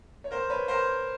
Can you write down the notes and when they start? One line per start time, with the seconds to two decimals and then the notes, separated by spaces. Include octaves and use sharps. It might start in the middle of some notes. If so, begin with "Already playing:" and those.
0.24 C#5
0.31 A#4 C5
0.50 B4 C#5
0.68 A#4 C5